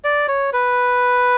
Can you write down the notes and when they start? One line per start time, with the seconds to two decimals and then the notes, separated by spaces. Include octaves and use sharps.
0.04 D5
0.28 C#5
0.53 B4